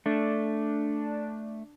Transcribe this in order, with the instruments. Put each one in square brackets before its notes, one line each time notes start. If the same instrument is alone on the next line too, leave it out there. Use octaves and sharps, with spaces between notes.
[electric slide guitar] A3 [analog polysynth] D4